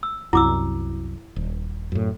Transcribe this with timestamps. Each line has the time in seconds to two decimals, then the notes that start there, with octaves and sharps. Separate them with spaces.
0.03 E6
0.33 C2 F#2 E4 D6 E6
1.36 D#1
1.92 F#2 A2